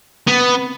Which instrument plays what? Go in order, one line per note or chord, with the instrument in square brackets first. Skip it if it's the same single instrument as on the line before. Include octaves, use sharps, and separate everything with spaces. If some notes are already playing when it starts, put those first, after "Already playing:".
[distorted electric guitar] B3